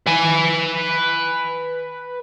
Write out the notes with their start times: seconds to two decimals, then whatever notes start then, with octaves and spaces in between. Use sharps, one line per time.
0.07 B4 G#5